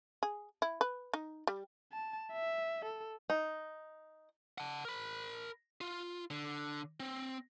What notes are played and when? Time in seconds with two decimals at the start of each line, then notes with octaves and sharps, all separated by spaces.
0.23 G#4
0.62 E4
0.81 B4
1.14 D#4
1.47 G3
1.93 A5
2.32 E5
2.85 A4
3.30 D#4
4.58 F#5 A5
4.85 A#4 B5
5.81 F4
6.30 D3
7.00 C4